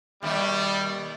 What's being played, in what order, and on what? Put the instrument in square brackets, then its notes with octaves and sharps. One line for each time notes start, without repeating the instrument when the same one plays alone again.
[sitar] D#2 B2 A3 [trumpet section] G3